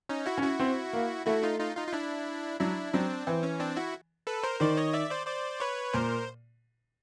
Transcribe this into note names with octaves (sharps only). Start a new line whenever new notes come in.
C#4 D#4
E4 F#4
C#4
E4 F#4
C4
A#3
A3 E4 F#4
D#4 F4
D#4 F4
D#4 F4
F4
D4 E4
F#3 D4 E4
F#3 C4 D4
E3 C4
C#4
C4 D4
E4 F#4
A4 B4
A#4 C5
D#3 C5 D5
C#5 D#5
D5 E5
C5 D5
C5 D5
B4 C#5
A#2 A#4 C5